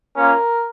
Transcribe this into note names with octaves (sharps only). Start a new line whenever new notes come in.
A#3 C#4 F4 A#4